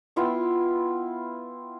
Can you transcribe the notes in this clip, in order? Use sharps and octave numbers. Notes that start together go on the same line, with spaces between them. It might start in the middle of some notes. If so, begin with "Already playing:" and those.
B3 E4 F4 G5